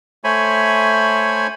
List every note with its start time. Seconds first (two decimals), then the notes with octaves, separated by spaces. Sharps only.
0.24 A3 C5 C#5 G#5 B5